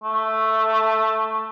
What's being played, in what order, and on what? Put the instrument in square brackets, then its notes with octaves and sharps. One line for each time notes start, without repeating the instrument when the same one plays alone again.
[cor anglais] A3